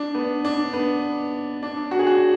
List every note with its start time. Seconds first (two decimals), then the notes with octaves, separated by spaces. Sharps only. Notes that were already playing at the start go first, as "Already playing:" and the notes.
Already playing: D4
0.15 B3
0.45 D4
0.73 B3
1.63 D4
1.91 F#4
1.99 G#4
2.07 F#4